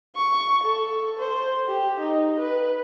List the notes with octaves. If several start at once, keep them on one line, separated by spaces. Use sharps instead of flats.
C#6
A4
C5
G4
D#4
B4